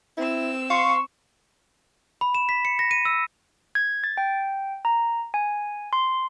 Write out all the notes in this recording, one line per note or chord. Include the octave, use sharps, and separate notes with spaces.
C4 E4 E6
F5 C6 C#6
B5
E7
B6
C#7
A#6
D#7
E6
G#6
A6
G5
A#5
G#5
C6